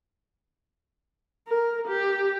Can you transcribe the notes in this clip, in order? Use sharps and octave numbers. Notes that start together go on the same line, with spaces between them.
A#4
G4